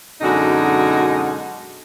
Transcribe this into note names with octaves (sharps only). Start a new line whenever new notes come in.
F#2 B2 D3 G#3 D#4 F#4